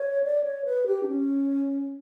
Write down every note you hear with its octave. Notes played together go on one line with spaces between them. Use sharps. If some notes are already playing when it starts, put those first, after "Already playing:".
Already playing: C#5
D5
C#5
B4
G4
D4
C#4